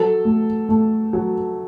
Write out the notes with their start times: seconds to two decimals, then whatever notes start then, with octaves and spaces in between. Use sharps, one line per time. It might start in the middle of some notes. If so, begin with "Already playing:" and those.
Already playing: F#3 A4
0.25 A3
0.69 A3
1.13 F#3